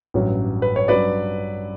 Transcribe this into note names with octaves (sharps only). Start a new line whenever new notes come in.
A1 G2 F#3 C#4
B4
C#5
G2 F#3 C#4 B4 D5